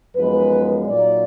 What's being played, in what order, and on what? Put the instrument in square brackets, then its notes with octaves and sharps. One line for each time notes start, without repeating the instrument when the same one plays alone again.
[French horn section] F#2 F3 G#3 B3 D#4 B4
A#2 F#3 A#3 D#4 D5